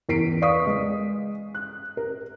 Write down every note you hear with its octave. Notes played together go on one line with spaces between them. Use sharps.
E2 A#4 B6 C7 D7
B4 D5 F5 C#6 D#6 B6
G#3
F#6
A#4